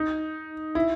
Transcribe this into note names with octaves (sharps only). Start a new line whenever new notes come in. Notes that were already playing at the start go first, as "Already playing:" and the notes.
Already playing: D#4
E4